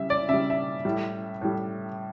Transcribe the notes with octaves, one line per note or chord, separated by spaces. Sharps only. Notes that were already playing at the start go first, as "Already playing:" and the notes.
Already playing: C#3 G3 E5
D5
C#3 G3 E5
E5
A2 G3
A2 G3